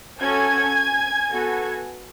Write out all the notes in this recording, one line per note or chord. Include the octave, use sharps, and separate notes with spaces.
C#4 F#4 A4 G#5 G#6
B3 F#4 A4